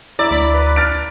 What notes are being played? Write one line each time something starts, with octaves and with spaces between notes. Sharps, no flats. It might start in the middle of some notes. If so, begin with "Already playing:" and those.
E4 D5 E5 A#5
D2 B5 D6
B4
F6 A6 D7